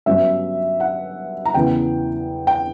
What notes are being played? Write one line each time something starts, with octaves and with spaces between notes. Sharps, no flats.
G1 G2 F#3 C#4 E5
F#5
A#5
E2 C#3 E3 B3 G5
G5